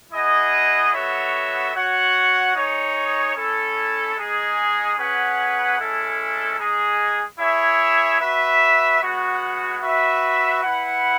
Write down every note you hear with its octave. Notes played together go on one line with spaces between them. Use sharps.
E4 G#4 D#5 F#5
B3 F#4 A4 C#5 E5
F#4 C#5 F#5
D#4 G#4 C#5
C#4 E4 A4
G#3 D#4 G#4
C#4 G#4 B4 F#5
G#3 C#4 E4 A4
G#3 D#4 G#4
E4 G#4 C#5 E5
F#4 B4 E5
G#3 B3 F#4
F#4 B4 E5
E4 B4 F#5